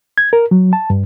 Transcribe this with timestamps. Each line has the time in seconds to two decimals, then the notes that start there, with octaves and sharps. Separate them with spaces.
0.18 G#6
0.33 A#4
0.51 F#3
0.73 A5
0.90 G2